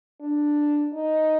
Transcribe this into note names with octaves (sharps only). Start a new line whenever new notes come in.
D4
D#4